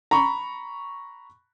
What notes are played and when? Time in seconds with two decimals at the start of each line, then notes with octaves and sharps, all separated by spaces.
0.11 A#5 B5 C#6